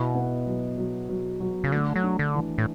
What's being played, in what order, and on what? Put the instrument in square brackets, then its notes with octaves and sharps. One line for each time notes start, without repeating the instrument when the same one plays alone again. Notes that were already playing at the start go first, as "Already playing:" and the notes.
Already playing: [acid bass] B2 [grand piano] E4
[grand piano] B3
F#3
F#3
F#3
F#3
[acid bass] C#3
[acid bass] D3 [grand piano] A3
[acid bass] F#3
[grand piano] D4
[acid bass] D3
[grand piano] E3
[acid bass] A2